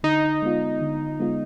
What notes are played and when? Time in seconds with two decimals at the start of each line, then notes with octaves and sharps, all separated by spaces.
0.03 D3 D#4
0.42 G#3 B3 F4
0.81 D3
1.20 G#3 B3 F4